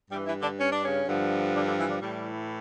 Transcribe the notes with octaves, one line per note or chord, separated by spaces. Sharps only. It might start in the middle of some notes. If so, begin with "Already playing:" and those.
G2 E3 G3 G4
E3 E4
D3 D4
C#4
D4
C#3 C#4
G2 D3 F3
D3 D4
D3 D4
E3 E4
D3 D4
A2 E3 G3